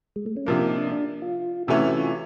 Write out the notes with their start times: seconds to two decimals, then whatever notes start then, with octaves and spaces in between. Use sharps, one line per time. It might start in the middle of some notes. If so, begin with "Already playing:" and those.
0.16 G#3
0.26 A3
0.37 C#4
0.46 C3 F3 A#3 D4
0.62 D#4
0.77 D4
0.92 D4
1.22 F4
1.67 C3 E3 A3 C#4 E4 F#4
1.98 F4